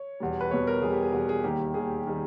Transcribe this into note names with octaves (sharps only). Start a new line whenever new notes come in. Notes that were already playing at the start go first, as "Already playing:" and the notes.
Already playing: C#5
E2 B2 G3
B4
E2 B2 G3 C#5
A#4
E2 B2 G3 G#4
G4
G#4
E2 B2 G3
G#4
D#2 D#3 G3 G4
D#2 D#3 G3 G#4
D#3 G3